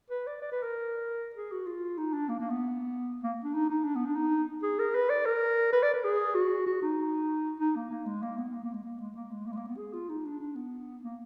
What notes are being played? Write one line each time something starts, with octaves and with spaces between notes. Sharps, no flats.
B4
D5
D5
B4
A#4
G#4
F#4
F4
D#4
D4
A#3
A#3
B3
A#3
D4
D#4
D#4
D4
B3
D4
D#4
G#4
A#4
B4
D5
A#4
B4
D5
B4
G#4
F#4
F#4
D#4
D#4
A#3
A#3
G#3
A#3
B3
A#3
A#3
G#3
A#3
G#3
A#3
G#3
A#3
G#3
A#3
B3
G#4
F4
D#4
D4
D4
B3
A#3